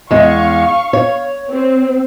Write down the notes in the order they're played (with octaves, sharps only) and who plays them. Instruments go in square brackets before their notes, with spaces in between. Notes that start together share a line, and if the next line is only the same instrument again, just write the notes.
[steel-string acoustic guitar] E2 G#3 [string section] F5 C#6
[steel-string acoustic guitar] C#5
[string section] C4